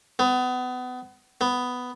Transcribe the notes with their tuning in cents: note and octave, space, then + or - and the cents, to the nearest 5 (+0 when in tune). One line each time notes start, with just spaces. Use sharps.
B3 +30
B3 +10